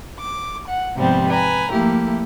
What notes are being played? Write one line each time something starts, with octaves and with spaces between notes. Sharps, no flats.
D6
F#5
G#2 C3 F3 G3 B3 C5
B4 G#5 A#5
F3 A3 A#3 E4 G4